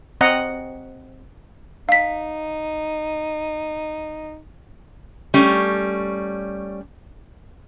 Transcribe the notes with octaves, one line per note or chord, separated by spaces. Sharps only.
C4 D#5 F#5 A#5
D#4 F5 B6
G3 A3 C#4